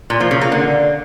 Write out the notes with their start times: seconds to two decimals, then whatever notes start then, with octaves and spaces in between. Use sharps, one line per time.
0.10 A#2
0.20 F3
0.31 C#3
0.41 A#3
0.52 D3